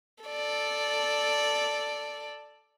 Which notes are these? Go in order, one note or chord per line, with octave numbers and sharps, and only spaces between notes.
A4 D5